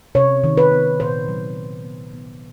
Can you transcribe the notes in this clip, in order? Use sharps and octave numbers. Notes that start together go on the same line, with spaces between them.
C3 C#5
D#3
B4
B3
A#2 C5
F#3
F#3
B3
B3